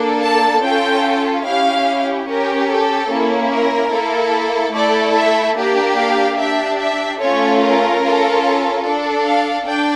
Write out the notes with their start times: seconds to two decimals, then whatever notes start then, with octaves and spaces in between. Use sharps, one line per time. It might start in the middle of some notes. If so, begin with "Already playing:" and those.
Already playing: A#3 D4 A4
0.22 A5
0.63 C#4 F4 A4 G5
1.45 C#4 E4 G4 F5
2.28 C#4 G4 A#4
2.68 A4
3.09 A#3 C#4 E4
3.51 A#4
3.91 A#3 E4 A4
4.73 A3 E4 A4 D5
5.15 E5
5.56 A#3 D4 G4
5.97 F5
6.37 D4 G4 E5
6.78 E5
7.19 A3 C#4 F4 A4 C#5
7.60 A#4
8.01 C#4 F4 A4
8.84 D4 A4
9.24 F5
9.65 D4 G5